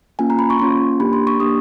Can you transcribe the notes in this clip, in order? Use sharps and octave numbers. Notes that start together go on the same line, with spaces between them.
A#3 C#4 F4 G#5
A#5
B5
C#6
A#3 C#4 F4 C6
A#3 D4 G4 B5
C6
C#6
A#3 D4 G4 D#6